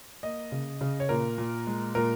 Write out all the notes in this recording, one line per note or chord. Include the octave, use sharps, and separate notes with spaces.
A#3 D#5
C#3
C#3
C#5
A#2 A#4
A#2
G#3
A#2 A#4